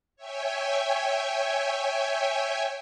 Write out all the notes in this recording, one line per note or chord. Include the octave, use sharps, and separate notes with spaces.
C#5 E5 G5 G#5